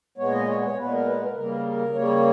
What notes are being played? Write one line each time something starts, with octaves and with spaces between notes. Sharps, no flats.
A#2 G#3 B3 C#5
D#5
C#5
C#5
A#2 G#3 B3 B4
A#4
B4
A#4
C#3 G3 A#3 A#4
A#4
C#3 G3 A#3 C#5